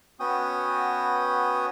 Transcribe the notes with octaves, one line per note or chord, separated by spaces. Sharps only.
B3 C#4 F#4 G5 D#6